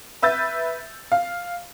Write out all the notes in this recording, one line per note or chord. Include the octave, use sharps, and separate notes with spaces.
B4 E5 E6 G6 A6
F5